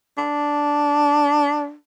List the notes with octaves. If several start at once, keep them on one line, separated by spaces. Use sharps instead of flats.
D4